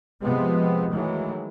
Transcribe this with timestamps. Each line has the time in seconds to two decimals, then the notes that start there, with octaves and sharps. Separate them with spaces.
0.23 C3 F3 G#3 B3 C4
0.91 D#3 E3 F#3 G#3 A3